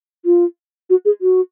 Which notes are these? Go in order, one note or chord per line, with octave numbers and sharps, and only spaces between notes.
F4
F#4
G#4
F#4